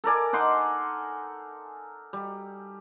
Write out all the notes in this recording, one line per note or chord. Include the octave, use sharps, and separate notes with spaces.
A4 A#4 D5 G#5
D#4 F#5 C6 D6
G3